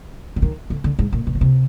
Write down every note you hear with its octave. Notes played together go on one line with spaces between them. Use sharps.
D3
D#3
D3
D3
G#2
A#2
B2
C#3
C3